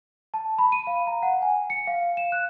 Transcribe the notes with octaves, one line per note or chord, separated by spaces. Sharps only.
A5
B5
D#7
F5
A#5
F#5
G#5
C#7
F5
E7
F#6